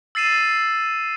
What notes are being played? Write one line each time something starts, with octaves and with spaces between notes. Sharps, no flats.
E6 A6 C7 D#7 E7